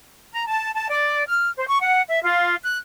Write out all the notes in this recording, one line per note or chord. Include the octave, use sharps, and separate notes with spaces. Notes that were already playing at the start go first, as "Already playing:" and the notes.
A#5
A5
A5
D5
F6
C5
C#6
F#5
E5
F4
F#6